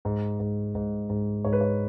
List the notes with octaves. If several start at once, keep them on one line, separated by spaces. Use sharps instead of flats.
G#2
G#2
G#2
G#2
G#2 C#5
B4
C#5